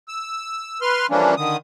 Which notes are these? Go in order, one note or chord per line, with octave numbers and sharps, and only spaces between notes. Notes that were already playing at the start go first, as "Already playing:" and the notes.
E6
B4 C6 F6
E3 F3 G3 A#3 C#4 D4
D3 D#3 D#6